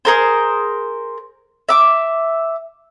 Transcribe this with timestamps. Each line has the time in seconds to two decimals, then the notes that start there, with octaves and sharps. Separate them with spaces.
0.05 G#4 A#4 C5
1.69 E5 D6